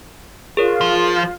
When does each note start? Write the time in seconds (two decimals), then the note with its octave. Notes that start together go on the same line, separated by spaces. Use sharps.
0.57 F4 G#4 A#4 C#5
0.81 F3